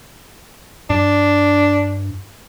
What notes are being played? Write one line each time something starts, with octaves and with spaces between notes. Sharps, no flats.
G2 D4